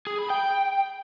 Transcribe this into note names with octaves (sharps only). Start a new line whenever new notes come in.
G#4
B5
G5